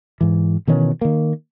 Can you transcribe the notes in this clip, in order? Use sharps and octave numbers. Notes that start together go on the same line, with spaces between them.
G#2 E3
B2 D#3 E3 C#4
D#3 A#3